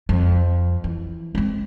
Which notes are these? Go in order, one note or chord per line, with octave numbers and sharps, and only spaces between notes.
F2
E3
G#3 C4